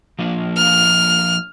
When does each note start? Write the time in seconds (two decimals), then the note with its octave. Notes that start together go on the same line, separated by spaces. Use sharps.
0.19 F3 A#3 D4
0.57 F6